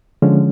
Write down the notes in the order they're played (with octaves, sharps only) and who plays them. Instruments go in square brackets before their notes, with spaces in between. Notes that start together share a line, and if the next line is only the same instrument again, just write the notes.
[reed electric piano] D3 F3 G#3 C#4